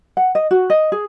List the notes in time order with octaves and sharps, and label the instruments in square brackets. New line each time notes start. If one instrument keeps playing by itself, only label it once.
[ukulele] F#5
D#5
F#4
D#5
G#4